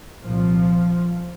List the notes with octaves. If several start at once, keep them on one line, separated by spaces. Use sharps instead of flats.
C2 A#2 F3